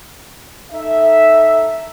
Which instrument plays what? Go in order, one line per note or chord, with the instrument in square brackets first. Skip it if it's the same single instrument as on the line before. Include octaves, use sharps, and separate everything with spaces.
[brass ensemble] D#4 A4 E5